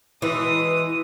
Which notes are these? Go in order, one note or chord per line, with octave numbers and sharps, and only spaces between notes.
B2 E3 G#3 D#6